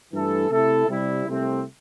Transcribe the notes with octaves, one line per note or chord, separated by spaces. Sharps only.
G2 E3 A3 E4 A4
C3 A3 E4 A4
C3 G3 E4
C2 C3 A3 C4